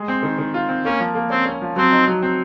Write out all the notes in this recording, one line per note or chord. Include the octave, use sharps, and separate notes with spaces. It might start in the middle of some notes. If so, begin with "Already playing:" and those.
Already playing: G#3
C4
D#3
D#3
F4
C4
A#3 C#4
F3
A#3
C4 C#4
C#4
F3
F#3 C4
D#4
F#3
C4